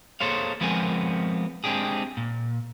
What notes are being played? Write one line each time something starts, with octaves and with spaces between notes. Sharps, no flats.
A#3 G#4 A4 C5 C#5 F5
F3 G#3 B3 C4 A#4 G#5
G#3 C4 D4 G4 G#4
A#2